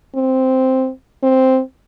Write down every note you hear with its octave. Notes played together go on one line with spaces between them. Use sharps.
C4
C4